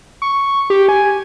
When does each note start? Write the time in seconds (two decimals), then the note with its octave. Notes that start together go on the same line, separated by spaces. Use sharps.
0.22 C#6
0.70 G4
0.89 G#5